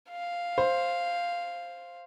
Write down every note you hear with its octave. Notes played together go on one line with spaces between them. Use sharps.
F5
C5